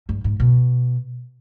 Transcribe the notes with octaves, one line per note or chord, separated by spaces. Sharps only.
G2
G#2
B2